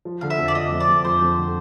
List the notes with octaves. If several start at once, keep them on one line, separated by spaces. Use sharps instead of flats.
F3
D3 F5
E5
F2
D5
F3 D#5
F2
D5
F2
F3 C5
F2
D3